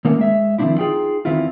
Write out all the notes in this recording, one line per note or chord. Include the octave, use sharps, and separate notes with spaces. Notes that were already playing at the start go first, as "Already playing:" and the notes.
D#3 A3 A#3 C#4
G#3 E5
D#3 F3 F#3 C4 D4 E4
D#4 F4 G#4 G5
E2 D#3 C4 E4 F4